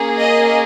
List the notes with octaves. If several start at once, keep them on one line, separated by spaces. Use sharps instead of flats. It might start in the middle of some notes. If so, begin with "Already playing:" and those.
Already playing: A#3 C#4 G#4
D#5